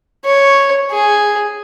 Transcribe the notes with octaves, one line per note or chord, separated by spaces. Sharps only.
C#5
G#4